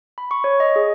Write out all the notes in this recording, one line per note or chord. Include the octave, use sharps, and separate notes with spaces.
B5
C#6
C#5
D#5
G#4